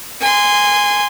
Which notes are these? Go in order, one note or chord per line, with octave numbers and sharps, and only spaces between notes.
G#5 C6